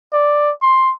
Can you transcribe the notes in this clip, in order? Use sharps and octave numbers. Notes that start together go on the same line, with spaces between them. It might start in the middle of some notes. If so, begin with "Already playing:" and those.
D5
C6